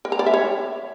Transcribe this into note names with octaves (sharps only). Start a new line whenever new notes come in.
A#4
A#5
D5
E5
C#5